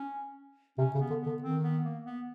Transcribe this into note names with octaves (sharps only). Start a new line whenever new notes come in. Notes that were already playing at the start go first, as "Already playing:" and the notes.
Already playing: C#4
C3 C#4
C#3
B3
D3
B3
D3
D#3 C4
B3
A#3
B3